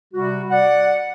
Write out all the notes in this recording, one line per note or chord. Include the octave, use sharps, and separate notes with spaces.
C3 G3 F#4
D5 F#5